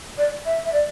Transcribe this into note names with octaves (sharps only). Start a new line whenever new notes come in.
D5
E5
E5
D5